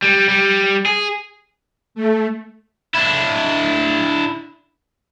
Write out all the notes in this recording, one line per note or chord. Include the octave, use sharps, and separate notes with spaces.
G3
G3
G#4
A3
D4 E4